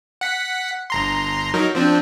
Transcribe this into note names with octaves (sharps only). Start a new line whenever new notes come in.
F#5 B6
G1 A#5 C6
F#3 D#4 A#4
F3 C4 D4